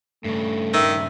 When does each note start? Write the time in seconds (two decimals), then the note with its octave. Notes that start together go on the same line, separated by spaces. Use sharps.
0.25 G2 C#3 A3
0.73 D#3 E5